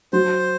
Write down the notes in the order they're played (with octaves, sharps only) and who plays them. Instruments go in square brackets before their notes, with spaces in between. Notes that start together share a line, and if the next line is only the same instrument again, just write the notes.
[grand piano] F#3 [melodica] C5